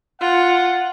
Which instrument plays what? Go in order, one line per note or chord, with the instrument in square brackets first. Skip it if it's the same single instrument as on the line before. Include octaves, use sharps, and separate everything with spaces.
[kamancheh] F4 [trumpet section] F#5